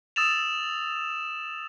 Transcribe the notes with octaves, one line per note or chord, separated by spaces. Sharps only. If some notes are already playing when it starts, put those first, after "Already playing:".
D#6 E6 A6 E7 F7